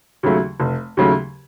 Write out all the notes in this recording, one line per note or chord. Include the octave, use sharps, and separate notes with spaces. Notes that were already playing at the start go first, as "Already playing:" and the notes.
D#2 C#3 F#3 A3
F1
D#2 C#3 F#3 A3